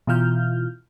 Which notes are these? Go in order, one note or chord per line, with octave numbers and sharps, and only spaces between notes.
B2 E3 E4 F4 F6 G6